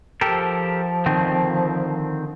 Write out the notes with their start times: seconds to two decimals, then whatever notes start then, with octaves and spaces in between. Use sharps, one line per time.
0.21 F3 G4 A4 A#4
1.06 D3 D#3 C4